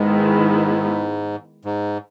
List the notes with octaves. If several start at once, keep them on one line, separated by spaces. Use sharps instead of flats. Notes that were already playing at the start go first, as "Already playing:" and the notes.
Already playing: G#2 D#3 G#3 B3 E4
G#2